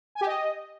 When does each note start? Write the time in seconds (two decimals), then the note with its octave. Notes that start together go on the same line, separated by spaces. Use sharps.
0.15 G#5
0.21 G4
0.27 D#5